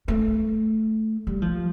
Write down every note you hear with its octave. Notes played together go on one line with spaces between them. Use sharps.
A3
G3
F3